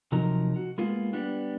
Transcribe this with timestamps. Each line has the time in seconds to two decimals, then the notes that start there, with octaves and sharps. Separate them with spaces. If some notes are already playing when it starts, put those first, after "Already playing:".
0.12 C3 F3 F#3 D#4 A#4
0.56 F#4
0.78 G#3 A#3 B3 F4
1.13 G3 B3 D4